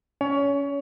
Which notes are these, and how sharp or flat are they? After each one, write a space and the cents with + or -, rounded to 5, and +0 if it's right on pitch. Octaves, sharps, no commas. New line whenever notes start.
C#4 +20 C#5 +30